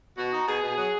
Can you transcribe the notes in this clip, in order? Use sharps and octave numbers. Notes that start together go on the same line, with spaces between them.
B2 F#4
D#4
B2 G#4
B2
F#3